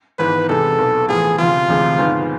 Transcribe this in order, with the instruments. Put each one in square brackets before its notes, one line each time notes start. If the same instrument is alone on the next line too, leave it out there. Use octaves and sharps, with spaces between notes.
[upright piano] G#1 G#2 E3 B3 [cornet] B4
[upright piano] E2 C3 G#3 [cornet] A4
[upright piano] B1 B2 B3
[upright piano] A1 A2 F3 B3 F4 [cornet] G#4
[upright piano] D2 C3 F3 [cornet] F4
[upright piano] E1 D2 C3 G#3
G#1 G#2 F3 G#3 B3